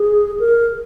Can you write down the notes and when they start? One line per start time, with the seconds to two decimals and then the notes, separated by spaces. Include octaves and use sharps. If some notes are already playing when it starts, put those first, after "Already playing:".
Already playing: G#4
0.40 A#4